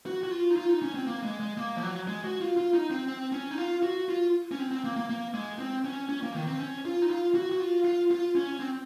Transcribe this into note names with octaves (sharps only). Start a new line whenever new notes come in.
F#4
F#4
F4
D#4
F4
D#4
C#4
C4
A#3
G#3
G#3
A#3
F3
F#3
G#3
F#4
F4
F4
D#4
C4
C4
C#4
D#4
F4
F#4
F4
C#4
C4
C4
A#3
A#3
A#3
G#3
C4
C#4
C#4
A#3
D#3
C4
C#4
F4
D#4
F4
F#4
F#4
F4
F4
F4
C#4
C4